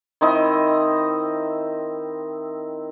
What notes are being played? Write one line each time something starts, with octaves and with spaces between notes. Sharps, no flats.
D#3 C4 E4 D#5